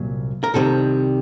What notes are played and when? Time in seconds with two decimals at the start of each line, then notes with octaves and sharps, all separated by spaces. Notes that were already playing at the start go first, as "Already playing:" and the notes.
Already playing: C2 A#2 F#3
0.44 A#4
0.54 C2 C3 D#3 G3 A4